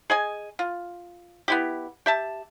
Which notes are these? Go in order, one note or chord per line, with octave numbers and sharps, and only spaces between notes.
G#4 D#5 G#5
F4
B3 E4 G4
G4 E5 A5